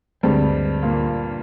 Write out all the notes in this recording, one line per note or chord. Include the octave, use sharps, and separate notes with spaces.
D2 G2 D3 G3 G#3 C4
A#2 A#3